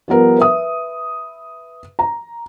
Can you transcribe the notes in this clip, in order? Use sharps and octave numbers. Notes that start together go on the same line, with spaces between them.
F3 G3 B3 A#4 B4
B4 E5 D#6
A#5